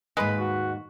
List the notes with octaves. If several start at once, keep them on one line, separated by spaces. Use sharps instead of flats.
D#2 G#2 G#3 B4
F#4